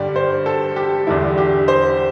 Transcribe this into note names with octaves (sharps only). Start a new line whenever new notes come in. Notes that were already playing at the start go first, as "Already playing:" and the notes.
Already playing: G2 D3 G3 D5
C5
A4
G4
E2 D3 G3 E4
G4
C5